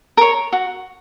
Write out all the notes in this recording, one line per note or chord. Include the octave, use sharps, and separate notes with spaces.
A#4 C#5
F#4